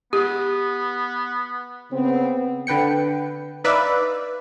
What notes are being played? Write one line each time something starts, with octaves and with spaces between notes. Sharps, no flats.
B3 G4
C#3 B3 C4
D3 B4 G5 C#7
D#4 B4 D5 E5 F5